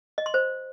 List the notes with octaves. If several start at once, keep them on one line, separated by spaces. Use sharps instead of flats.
D#5
C6
C5